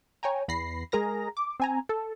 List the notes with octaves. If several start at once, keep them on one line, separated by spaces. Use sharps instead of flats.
C#5 G5 G#5 A#5
E2 B5 A#6 C7
G#3 G#4 A#4 A#5 A#6
D6
C4 G#5 A#5
A4